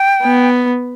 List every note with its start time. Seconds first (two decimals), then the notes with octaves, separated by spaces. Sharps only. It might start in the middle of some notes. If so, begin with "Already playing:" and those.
Already playing: G5
0.23 B3